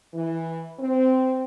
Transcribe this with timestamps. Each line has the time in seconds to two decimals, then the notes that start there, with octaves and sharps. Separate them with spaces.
0.14 E3
0.80 C4